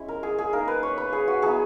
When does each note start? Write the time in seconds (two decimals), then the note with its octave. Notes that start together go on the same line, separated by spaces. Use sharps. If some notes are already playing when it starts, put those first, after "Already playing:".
Already playing: G#3 C#4 E4
0.08 A#4
0.23 G#4
0.38 G#4
0.53 A#3 D#4 A#4
0.68 B4
0.83 C#5
0.98 B4
1.13 G#4
1.28 F#4
1.42 F#3 B3 E4 G#4